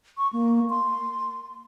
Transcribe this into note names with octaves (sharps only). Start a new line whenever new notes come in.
C#6
A#3
C6